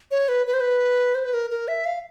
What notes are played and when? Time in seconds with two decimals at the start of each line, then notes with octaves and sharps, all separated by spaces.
0.11 C#5
0.29 B4
0.47 B4
0.54 C5
0.61 B4
1.15 C5
1.25 B4
1.34 A#4
1.51 A#4
1.68 E5
1.86 F5